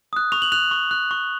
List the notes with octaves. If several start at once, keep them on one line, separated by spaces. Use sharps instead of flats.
D#6 F#6
C#6 F7
F#7
F#6 F7
C#6
F#6
C#6